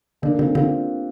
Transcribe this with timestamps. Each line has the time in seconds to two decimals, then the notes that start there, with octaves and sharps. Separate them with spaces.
0.22 D3 A#3 D4
0.38 D3 C4 F4
0.55 D3 C4 F4